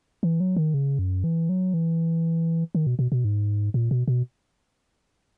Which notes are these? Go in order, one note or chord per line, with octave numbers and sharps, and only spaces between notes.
E3
F#3
D#3
C#3
F#2
E3
F#3
E3
D#3
B2
B2
B2
G#2
A#2
B2
B2